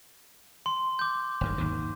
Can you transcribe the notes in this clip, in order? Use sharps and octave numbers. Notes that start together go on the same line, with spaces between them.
C6
D6 G6
F#1 G2 D#3
D#2 G#2 D#3